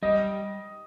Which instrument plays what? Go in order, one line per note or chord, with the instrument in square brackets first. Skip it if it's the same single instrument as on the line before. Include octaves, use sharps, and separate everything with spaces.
[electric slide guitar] G3 [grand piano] D#5